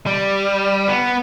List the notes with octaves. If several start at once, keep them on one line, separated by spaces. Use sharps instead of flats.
G3
B3